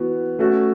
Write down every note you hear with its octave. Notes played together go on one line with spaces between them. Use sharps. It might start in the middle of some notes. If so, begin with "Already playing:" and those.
Already playing: E3 B3 F#4
A3 C#4 F#4 A4